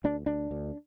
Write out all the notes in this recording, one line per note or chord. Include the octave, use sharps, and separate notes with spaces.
D2 D4
D2 D4
D2